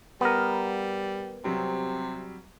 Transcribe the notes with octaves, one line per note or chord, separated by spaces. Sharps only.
G3 B3 A#4
C3 F#3 G3 C4